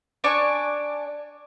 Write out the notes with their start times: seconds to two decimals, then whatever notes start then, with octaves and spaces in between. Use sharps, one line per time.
0.24 D4 D5 G#5 C#6